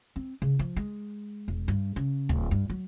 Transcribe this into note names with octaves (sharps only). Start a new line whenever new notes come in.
C4
C#3
F3
G#3
E1
G2
C#3
D1
G2
F#3